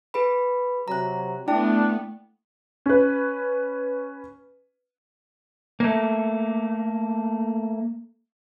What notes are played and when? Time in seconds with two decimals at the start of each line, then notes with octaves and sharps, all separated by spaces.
0.14 G#4 B4 B5
0.88 C3 F#3 A#5 F#6
1.48 A3 B3 D4 E4 G5 A5
2.86 C#4 B4
5.80 A3 A#3